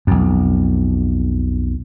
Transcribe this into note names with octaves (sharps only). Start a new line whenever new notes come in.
B1 F2